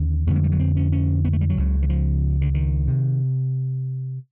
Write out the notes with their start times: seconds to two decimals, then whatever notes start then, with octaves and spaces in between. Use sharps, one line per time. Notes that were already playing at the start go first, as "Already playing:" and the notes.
Already playing: D#2 D3 C#4
0.27 F2 D3 B3
0.35 G#3
0.44 G3
0.52 F#3
0.60 C4
0.77 C#4
0.92 C#4
1.25 B3
1.33 A3
1.41 G3
1.50 F#3
1.57 C#2 C#3
1.82 E3
1.90 F3
2.41 D3
2.54 D#3
2.88 C3